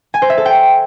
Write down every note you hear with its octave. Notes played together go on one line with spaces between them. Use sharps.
G#5
C5
E5
A4
G5